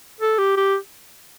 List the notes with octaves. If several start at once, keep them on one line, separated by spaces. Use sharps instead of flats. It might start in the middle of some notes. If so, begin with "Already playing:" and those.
A4
G4
G4